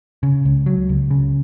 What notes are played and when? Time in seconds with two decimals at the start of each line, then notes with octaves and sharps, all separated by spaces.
0.23 C#3
0.45 C#2
0.66 F#3
0.89 C#2
1.11 C#3